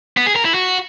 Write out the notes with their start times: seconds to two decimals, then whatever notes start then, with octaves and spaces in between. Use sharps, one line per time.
0.17 B3
0.26 G#4
0.36 A#4
0.45 E4
0.54 F#4